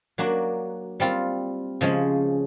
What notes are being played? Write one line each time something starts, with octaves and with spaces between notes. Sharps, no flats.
F#3 A#3 D4 F#4
G3 C4 F4
C#3 F3 G#3 C#4